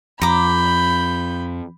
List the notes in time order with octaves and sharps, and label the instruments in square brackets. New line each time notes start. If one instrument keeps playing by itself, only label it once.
[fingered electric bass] F2 [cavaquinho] A#5 D6 [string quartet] B5 G6